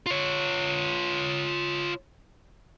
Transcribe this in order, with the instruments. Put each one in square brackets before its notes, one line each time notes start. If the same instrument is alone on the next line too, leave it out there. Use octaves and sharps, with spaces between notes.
[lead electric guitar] F4 C#5